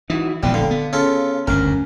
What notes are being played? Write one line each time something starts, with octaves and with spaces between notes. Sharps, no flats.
E3 D#4 E4 F#4
D#1 A#1 D#2 E3 G3 G#3 B3
D3 F5
B3
C#3 F4 A4
F#1 D2 G2 C#4 A#4